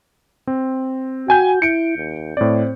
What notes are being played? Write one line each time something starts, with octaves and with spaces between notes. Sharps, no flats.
C4
F#4 G5 G#5 G6
E4 C#7 D7
D#2
A2 C4 D5